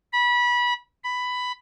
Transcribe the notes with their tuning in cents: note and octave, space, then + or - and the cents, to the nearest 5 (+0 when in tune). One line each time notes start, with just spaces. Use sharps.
B5 -25
B5 +10